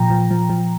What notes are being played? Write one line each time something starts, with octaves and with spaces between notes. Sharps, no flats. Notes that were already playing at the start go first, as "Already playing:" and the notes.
Already playing: A#2 F3 G5 A#5
F3
F3
F3